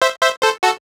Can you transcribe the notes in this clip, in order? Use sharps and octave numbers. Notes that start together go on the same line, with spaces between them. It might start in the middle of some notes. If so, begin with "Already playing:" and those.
C5 E5
C5 E5
A4 C5
F#4 A4